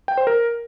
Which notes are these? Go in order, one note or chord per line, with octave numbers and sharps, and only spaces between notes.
G5
C5
A#4